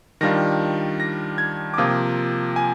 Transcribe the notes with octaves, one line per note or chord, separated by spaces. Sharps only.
D#3 G3 D4 F4 A#6
A#6
G#6
D6
C3 F3 A#3 F4 D#6
G#5